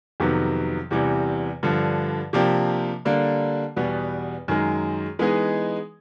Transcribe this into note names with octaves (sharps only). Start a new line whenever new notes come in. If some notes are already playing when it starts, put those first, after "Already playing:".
F2 C3 D#3 F#3 B3
E2 C3 E3 G3
G2 D3 F3
C3 F3 A#3 D4 G4
D3 G3 A#3 D4
E2 B2 G3 B3
F#2 D#3 G#3
E3 G#3 B3 D#4 G#4